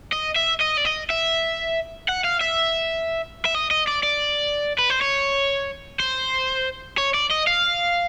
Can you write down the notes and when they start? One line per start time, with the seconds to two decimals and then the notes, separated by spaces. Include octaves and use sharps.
0.12 D#5
0.36 E5
0.60 D#5
0.77 D5
0.85 D#5
1.10 E5
2.08 F#5
2.24 F5
2.41 E5
3.46 E5
3.55 D#5
3.71 D#5
3.88 D5
4.03 D5
4.79 B4
4.90 C5
5.01 C#5
6.00 C5
6.98 C#5
7.14 D5
7.30 D#5
7.47 F5